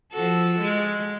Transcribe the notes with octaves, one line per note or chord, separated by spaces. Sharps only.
F3 F#4 A4
G#3